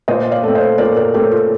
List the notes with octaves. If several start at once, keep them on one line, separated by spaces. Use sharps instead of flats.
A#2 C5 D#5
D5 F5
A3 C4
C5 D#5
A#2 A#4 D5
A#4 D5
A3 C4 G4 A#4
F4 A4